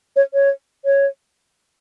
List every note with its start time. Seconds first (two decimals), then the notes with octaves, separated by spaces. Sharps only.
0.16 C#5
0.34 C#5
0.85 C#5